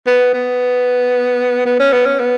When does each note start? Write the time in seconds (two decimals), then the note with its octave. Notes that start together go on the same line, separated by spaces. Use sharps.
0.07 B3
0.33 B3
1.66 B3
1.79 C#4
1.93 B3
2.06 C#4
2.20 B3